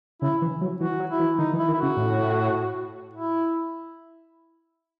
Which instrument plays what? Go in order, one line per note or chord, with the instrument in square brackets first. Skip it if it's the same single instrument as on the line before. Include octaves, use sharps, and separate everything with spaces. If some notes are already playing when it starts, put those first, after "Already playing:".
[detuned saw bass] C#3 [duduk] E4
[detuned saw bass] E3
F#3
[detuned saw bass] E3 [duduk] F#4
[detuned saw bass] F#3
[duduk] E4
[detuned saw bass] E3
[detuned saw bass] D#3 [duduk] D#4
[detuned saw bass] E3
[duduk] E4
[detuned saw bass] D#3
[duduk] E4
F#4
[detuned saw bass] C#3
A2
[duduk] E4